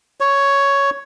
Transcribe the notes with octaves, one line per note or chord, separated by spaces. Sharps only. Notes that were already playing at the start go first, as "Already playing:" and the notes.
C#5